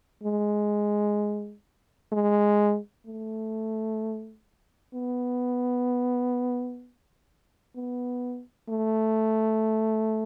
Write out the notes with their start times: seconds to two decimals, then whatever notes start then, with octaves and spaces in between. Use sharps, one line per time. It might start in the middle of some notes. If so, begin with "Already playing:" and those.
0.23 G#3
2.12 G#3
3.06 A3
4.94 B3
7.75 B3
8.69 A3